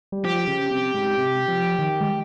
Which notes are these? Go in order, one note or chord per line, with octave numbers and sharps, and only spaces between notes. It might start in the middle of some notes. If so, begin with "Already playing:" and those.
G3
F3 G4
C#3
C3
G#2
C3
F3
D#3
G#3